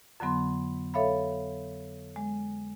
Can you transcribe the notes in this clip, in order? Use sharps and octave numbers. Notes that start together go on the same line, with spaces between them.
F2 D3 F#3 B3 C6
A4 C#5 E5 F5 B5
G#3